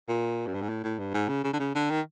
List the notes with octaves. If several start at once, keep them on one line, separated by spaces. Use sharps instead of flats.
A#2
F#2
G2
G#2
A2
A2
G2
G#2
C#3
C#3
D3
C#3
D3
D#3